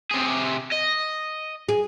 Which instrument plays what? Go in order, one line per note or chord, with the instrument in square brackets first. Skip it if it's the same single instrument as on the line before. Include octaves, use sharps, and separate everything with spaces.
[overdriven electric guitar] C3 G#4
D#5
[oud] G#4